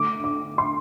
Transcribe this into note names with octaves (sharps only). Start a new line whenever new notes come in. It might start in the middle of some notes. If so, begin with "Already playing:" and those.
Already playing: D3 A3 D6
D6
C6